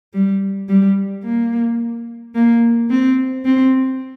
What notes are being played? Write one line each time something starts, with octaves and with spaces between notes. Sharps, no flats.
G3
G3
A#3
A#3
C4
C4